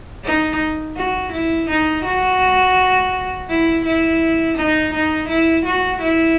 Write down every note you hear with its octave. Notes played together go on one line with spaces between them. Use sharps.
D#4
F#4
E4
D#4
F#4
E4
E4
D#4
D#4
E4
F#4
E4